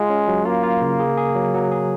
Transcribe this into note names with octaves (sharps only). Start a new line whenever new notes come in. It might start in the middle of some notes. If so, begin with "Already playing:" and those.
Already playing: G#3 F4
C#4
F#3
A#3 F4
F4
C#3
G#4
G#4
F#3
F#3
G#4